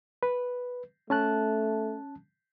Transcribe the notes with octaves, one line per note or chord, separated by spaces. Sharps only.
B4
A3 C#4 A5 F#6